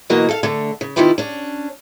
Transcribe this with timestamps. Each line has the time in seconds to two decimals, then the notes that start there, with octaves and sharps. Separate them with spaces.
0.10 B2 E3 F#3 A#3 F#4 D#5
0.29 A4 F5
0.43 D3 A3
0.81 C#3
0.96 C3 D#3 E4 F4 G4 B4
1.18 C#4 D4